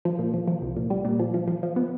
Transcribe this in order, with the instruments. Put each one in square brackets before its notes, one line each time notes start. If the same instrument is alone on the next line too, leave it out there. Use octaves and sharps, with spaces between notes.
[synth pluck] F3
A#2
F3
F3
C2
A#2
G3
A#2
F3
F3
F3
F3
B3